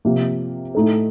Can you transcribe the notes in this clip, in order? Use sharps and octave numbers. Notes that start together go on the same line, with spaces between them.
C3 F3 A#3
A2 A3 D#4 A4